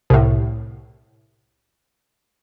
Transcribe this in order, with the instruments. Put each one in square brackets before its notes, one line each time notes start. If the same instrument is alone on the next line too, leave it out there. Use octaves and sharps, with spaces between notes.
[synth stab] C2 A2